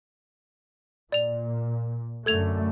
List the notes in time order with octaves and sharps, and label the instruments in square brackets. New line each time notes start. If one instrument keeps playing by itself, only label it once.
[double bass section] A#2 [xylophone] D5 F7
[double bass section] F#2 D3 A3 [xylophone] A4 G#6 F7